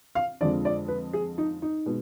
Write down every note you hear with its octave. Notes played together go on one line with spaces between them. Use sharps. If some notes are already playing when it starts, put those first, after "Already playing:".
F5
F2 D3 F3 G#3 D5
D5
B4
G#4
D#4
D#4
B2 G#3